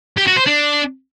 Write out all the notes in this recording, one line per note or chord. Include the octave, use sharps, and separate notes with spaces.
G4
F#4
C5
D4